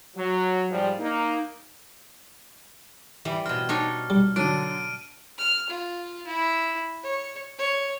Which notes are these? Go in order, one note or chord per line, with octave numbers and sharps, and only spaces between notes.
F#3
G#2 F3 G3
A#3 D#4
E3 G3
B2 C4 F6
D4 D#4 C#5
G3
D3 F#3 D4 D7 D#7
F6
F4
E4
C#5
C#5